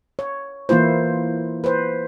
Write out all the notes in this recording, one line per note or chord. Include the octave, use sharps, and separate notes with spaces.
C#5
E3 A#3 E4 F4 C5
B4 C5